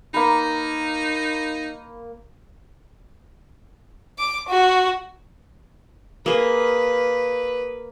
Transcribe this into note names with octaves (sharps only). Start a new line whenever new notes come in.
A#3 D#4 B5
D6
F#4
A#3 G#4 B4